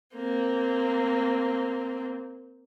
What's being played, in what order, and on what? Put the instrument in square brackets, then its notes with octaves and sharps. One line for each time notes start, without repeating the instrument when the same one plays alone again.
[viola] A#3 C4